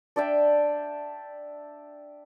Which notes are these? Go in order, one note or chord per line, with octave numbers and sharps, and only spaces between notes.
D4 D5 E5 G5